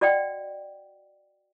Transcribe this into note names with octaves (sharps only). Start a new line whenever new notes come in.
F#4 D5 D#5 F#5 G5